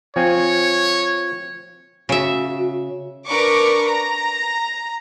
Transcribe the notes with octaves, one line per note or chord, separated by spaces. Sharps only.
F3 C4 C#5 G#5
C#3 F#4 E5
D4 A#4 B4 C#6 D6
A#5